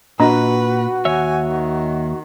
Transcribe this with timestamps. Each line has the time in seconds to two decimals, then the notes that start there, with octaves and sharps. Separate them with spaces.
0.20 A#2 D4 F#4 B4 D#5
1.05 D#2 C#5 E5 G#5
1.46 D#3